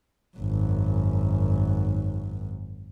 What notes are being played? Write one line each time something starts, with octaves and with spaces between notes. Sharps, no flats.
G#1 F#2